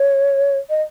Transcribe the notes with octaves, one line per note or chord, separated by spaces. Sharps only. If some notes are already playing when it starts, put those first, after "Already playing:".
Already playing: C#5
D#5